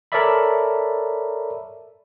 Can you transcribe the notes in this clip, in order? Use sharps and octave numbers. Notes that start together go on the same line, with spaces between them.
A4 A#4 C#5 D5 E5 B5